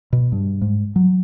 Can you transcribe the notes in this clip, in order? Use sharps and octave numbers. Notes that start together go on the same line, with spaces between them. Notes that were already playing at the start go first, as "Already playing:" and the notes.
B2
G2
G#2
F#3